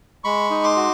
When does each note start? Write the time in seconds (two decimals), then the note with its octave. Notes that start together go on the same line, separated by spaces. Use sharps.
0.24 G#3 B5 C#6
0.50 D#4
0.64 C6 D6
0.76 F#4